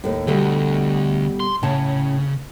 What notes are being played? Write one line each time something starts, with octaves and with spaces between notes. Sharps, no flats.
D#2 A2
D2 B2 D3 G3 A3
C6
A2 C#3 C#4 A5